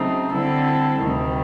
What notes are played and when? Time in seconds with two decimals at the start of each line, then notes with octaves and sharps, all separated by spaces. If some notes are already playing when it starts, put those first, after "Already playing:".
Already playing: C#3 F#3 A3 C4 D#4
0.32 D3 G3 C4 E4 A4
1.01 D2 C3 D#3 G3